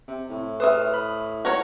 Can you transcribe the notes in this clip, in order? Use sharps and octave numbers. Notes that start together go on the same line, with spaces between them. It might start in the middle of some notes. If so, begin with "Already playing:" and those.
C3
A2
B4 C5 E5 D#6 F6
B5
F#4 A#4 C#5